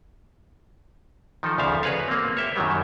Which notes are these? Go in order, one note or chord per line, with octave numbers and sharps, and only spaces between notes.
D#3 F3 D#4 A4
D2 C#3 F3 E5 F5
F#4 G#4 B4 C#5 F5
A#3 C4
C#5 E5 G5
F#2 D#3 F#3 G3